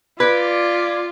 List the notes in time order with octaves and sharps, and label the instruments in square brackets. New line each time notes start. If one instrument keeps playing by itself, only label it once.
[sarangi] F4 [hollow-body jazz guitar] B4 [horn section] D5 [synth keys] G#6 B6 D7